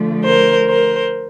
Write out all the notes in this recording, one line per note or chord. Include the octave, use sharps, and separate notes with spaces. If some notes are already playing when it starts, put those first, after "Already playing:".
Already playing: D3 F3 A3
A#4 C5
A#4 C5